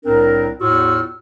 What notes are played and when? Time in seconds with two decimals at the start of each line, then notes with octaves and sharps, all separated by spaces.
0.05 C2 A2 C4 D4 A#4
0.61 E2 A2 F4 F#4 E6 F6